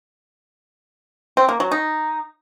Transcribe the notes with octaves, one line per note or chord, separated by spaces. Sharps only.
C4
A#3
F#3
D#4